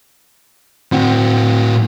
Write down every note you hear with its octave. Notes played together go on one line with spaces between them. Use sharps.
A2 C4 F#4